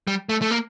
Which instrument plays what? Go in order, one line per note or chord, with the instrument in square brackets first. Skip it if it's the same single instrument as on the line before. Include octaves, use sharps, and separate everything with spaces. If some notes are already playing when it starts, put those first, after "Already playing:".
[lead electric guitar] G3
A3
A3
A#3